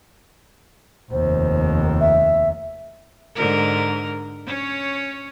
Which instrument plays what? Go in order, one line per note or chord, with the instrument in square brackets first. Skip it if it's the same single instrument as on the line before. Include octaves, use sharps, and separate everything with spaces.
[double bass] F1 D#2 [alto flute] C5
[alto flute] E5
[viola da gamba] G#2 D3 A#4
C#4 C#5